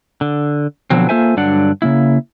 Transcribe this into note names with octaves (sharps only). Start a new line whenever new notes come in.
D3
B2 D3 F3 F#3 C4
A#3 F4 A4 C5 E5 G#5
G2 D3 F#3 D4 D5 F#5
C#3 A#3 E4